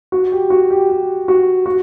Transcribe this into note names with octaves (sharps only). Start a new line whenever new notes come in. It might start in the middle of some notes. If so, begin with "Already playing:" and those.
F#4
G4
F#4
G4
G4
F#4
F#4